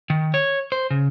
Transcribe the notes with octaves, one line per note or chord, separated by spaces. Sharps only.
D#3
C#5
C5
C#3